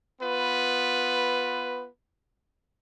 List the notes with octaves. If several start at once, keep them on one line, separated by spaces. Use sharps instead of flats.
B3 F4 B4